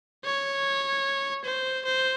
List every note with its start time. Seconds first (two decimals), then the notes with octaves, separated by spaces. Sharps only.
0.25 C#5
1.44 C5
1.85 C5